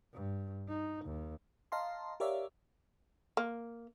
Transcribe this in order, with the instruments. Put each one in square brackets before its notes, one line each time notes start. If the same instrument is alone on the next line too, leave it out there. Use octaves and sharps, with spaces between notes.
[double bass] G2
D#4
D#2
[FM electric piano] D#5 F5 A5 A#5 C6
G4 A#4 C#5 D5 E5 F5
[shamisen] A#3